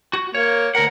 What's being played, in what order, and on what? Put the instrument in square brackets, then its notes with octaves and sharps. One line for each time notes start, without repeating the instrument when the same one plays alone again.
[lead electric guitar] F#4
[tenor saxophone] A#3 [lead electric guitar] C#5
[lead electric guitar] D2 F#5 [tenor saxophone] A#4